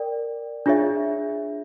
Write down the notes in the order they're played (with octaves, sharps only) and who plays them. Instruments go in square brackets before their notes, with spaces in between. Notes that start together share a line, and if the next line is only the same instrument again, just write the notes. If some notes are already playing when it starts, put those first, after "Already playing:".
Already playing: [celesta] A#4 D5 G5
D4 F4 G#4 C#5 E5